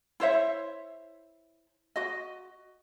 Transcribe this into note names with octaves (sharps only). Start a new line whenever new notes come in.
E4 C5 C#5 E5
F#4 D#5